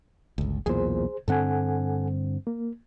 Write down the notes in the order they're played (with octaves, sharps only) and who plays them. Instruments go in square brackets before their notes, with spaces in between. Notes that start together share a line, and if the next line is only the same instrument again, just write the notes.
[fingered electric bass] G1 C#2
[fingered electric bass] B1 E2 A#2 [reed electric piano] G#4 C5
[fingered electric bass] G2 D3 C4 [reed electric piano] A4 F#5 G#5
[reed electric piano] A#3